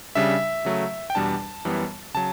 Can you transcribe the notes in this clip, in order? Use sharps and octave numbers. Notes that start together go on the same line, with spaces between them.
C#3 G3 D4 E5
C#3 F#3 A3
G5
E2 B2 G3 D4 A5
F#2 E3 G3 B3
C#3 F#3 A5